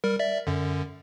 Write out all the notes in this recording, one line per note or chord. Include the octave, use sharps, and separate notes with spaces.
G3 A#4
D5 E5
F#2 D3